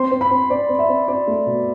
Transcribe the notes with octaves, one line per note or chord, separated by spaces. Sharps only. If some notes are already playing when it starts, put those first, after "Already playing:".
Already playing: C4 C6
C4
B5
C4
C4 D5
C4
E5
C4
C4 D5
A3
B2